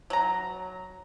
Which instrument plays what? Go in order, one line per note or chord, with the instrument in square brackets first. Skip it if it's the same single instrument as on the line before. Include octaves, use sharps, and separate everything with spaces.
[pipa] F#3 A#5